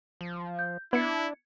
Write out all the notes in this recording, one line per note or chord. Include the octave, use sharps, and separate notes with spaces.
F3
G6
B3 D4 E4 G#6 C#7